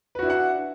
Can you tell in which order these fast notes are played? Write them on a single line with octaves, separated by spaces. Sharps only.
B4 F#4 E4 D4 F#5